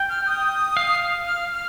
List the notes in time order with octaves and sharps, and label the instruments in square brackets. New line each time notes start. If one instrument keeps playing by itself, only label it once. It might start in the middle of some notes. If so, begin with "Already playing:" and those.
Already playing: [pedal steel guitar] G5
[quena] F6
D#6
[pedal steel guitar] F5
[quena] F6
F6